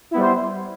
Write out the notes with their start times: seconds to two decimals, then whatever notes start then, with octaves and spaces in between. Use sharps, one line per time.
0.11 E4
0.14 B3
0.17 G3
0.20 C5